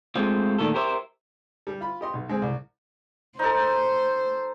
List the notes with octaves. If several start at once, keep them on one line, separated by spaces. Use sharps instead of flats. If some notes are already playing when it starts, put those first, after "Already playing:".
G#3 A3 C4 F4
A#2 D3 D#3 A3 A4
G4 A#4 C5 D#5 E5
G3
F4 B5
G4 D#5 C6
B1
D3 G#3 C4
C2
D#4 A4 C5